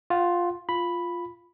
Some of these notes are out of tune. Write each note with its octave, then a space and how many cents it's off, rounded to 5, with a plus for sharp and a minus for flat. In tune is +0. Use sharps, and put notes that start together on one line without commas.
F4 +5 F#5 +35
F4 +0 B5 +0